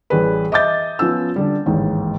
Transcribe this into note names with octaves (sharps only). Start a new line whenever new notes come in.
A1 G3 G#4 B4
D#5 E5 D6 G6 A6
F3 B3 C#4 E6
D3 G3
A1 D#2 G#2